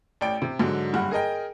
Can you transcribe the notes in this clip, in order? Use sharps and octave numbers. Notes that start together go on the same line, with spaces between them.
A1 D5 G5 D7
C3
G#2 D3 F#3
F#1 G2 F#5
G#4 A#4 D#5 G5